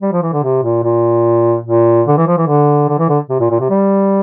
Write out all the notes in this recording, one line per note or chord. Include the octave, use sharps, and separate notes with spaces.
G3
F3
E3
D3
C3
A#2
A#2
A#2
D3
E3
F3
E3
D3
D3
E3
D3
C3
A#2
A#2
C3
G3